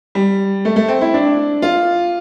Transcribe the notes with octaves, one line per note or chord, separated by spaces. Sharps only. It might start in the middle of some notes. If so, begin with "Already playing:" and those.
G3
A3
A3
C4
E4
D4
F4